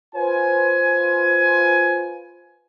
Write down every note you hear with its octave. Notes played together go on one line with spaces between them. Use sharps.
F4 B4 C5 G#5